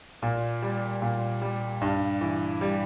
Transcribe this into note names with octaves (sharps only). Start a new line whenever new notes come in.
A#2
G3
A#2
G3
G2
E3
G3